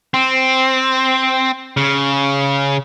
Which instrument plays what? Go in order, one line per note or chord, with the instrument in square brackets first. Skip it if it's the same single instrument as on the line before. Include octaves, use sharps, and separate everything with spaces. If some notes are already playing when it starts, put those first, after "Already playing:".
[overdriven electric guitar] C4
C#3